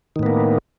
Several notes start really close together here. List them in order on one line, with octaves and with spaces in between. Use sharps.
D#3 A2 B3 A#3